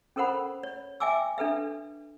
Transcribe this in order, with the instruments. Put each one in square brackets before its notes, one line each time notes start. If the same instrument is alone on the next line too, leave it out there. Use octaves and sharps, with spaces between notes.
[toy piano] C#4 A4 A#4 C5 F#5 B5
C#5
E5 G5 G#5 D6 E6
D4 A4 B4 E5